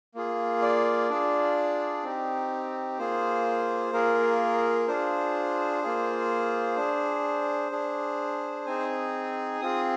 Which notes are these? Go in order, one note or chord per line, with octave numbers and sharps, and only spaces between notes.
A#3 F4 G#4
D5
D4 F4 G#4
C4 D#4 G4
A#3 F4 G#4 C5
A#3 F4 G#4 A#4
D4 F4 G#4 C5
A#3 F4 G#4
D4 G#4
D4 G#4
C4 D#4 G#4 G#5
C4 F4 G#4 D#6